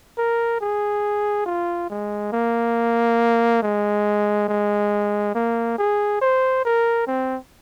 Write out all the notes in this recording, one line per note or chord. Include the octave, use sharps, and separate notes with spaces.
A#4
G#4
F4
G#3
A#3
G#3
G#3
A#3
G#4
C5
A#4
C4